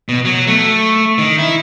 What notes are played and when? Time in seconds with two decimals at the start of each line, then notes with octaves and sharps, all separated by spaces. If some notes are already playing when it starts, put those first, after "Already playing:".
0.09 B2
0.25 F#3
0.47 A3
1.18 D#3
1.38 E4